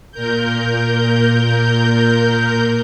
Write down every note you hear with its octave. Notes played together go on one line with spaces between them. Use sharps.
A#2 A#4 G6